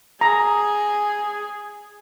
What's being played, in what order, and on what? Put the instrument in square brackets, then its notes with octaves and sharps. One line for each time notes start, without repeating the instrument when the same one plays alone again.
[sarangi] G#4 [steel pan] A#5